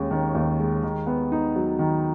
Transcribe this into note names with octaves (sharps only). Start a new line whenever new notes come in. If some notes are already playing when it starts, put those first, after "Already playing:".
Already playing: D#2 G#3 C#4
D#3
D#2
G#3
D#3
B3
D#4
F#3
D#3